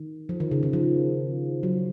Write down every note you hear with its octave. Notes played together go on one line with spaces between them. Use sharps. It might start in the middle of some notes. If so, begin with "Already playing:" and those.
Already playing: D#3
F3
D#3
C#3
D#3
F3
F#3